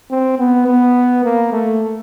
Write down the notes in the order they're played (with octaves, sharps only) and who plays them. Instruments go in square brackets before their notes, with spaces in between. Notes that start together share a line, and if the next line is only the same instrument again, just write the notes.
[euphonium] C4
B3
B3
A#3
A3